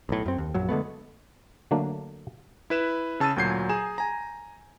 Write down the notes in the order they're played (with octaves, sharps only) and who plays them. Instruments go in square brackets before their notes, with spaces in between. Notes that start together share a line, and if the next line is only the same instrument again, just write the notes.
[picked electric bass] B1 A2
F#2 C4
D#2
A#1 F#2 F#3
D3 G#3 A3 B3
[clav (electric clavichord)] D3 F#3 A3 A#3 D4
[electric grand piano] E4 B4 E7
C#3 A5 E6 A6 D#7
D2 A#2 F#3 G6 G#6 C7
G#4 G#5 A#5 E7
G#5 A#5